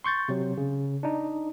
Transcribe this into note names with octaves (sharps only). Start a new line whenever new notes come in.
C6 C#6 G6 A6
C3 F#3
C#3
D4 D#4